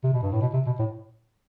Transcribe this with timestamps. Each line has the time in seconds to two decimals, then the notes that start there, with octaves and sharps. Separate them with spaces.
0.03 C3
0.13 B2
0.23 G2
0.32 A2
0.41 B2
0.54 C3
0.66 B2
0.79 A2